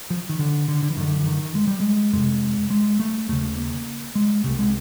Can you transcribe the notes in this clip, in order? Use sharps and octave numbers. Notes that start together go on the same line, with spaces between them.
F3
D#3
D3
D3
D3
E3
F#2 D3 D#3
E3
D#3
G#3
G3
G#3
F2 C3 G#3
G#3
A3
D#2 C#3 A3
A#3
G#3
C2 C3 A3
G#3